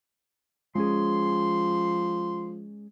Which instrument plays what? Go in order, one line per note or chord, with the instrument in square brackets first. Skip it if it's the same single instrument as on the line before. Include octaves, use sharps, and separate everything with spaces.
[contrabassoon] F3 [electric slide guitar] G#3 C#4 G#4 [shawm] C6